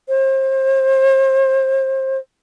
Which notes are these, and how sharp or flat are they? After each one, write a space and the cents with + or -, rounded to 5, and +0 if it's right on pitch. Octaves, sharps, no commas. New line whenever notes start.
C5 +30